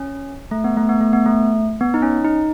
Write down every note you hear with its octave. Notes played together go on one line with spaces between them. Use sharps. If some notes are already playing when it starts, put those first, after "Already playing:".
Already playing: C#4
A3
B3
A3
B3
A3
B3
A3
B3
D#4
C#4
D#4